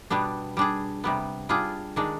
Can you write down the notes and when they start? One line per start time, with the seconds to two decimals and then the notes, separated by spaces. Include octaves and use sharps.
0.10 B2 G3 B3 D4
0.57 G3 D4 G#4
1.04 C3 G3 B3
1.49 G3 D4 F4 G#4
1.96 D#3 G#3 D4